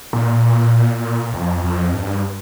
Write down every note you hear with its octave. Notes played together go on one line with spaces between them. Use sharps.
A#2
F2
F2
G2